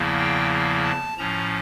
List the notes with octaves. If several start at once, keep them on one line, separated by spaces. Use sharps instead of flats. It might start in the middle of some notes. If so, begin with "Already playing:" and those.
Already playing: E2 C#3 F3 A#3 E4
G5
A5
A2 F3 C#4 A#5